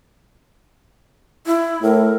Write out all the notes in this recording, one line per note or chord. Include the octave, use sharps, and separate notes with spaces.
E4
A2 A#4